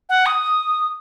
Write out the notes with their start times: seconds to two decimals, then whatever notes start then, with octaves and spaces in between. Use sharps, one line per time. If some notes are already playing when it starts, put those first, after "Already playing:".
0.09 F#5
0.26 D#6